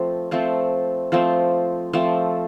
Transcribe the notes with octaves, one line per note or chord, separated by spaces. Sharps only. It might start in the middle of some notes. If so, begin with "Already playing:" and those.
Already playing: F3 A3 C4
F3 A3 C4
F3 A3 C4
F3 A3 C4